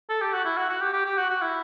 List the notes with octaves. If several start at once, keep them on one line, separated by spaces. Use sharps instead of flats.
A4
G4
F#4
E4
F#4
F#4
G4
G4
G4
F#4
F#4
E4